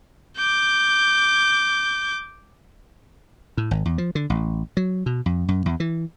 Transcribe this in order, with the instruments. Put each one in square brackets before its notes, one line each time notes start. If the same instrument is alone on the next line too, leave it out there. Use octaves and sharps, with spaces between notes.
[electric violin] D6 G6
[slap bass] A2
G#1
E2
F3
D3
A1
F#3
B2
F2
F#2
E2
E3